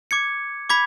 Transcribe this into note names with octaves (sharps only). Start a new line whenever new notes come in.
D6 G#6 C#7
B5 D6 G#6 B6